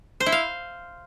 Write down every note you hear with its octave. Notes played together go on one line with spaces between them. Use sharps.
C5
E4
F5